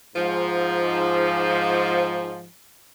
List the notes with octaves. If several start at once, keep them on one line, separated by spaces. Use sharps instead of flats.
G#2 F3